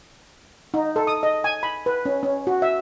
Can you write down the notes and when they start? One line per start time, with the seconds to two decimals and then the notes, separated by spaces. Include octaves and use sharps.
0.74 D#4
0.96 A4
1.07 D#6
1.23 D#5
1.44 G#5
1.63 B5
1.86 B4
2.05 C#4
2.23 C#4
2.47 F#4
2.62 E5